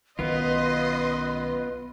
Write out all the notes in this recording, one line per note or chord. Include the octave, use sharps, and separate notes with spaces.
B1 D#3 B3 F4 B4 D#5 C6